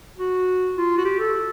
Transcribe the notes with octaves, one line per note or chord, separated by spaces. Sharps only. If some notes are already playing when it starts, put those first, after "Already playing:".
F#4
F4
F#4
G4
A4